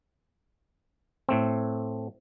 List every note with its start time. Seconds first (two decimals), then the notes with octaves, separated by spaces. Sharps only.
1.29 A2 A3 C4